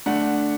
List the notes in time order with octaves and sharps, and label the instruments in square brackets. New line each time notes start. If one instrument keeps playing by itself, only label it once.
[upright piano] D3 A3 D4 F#5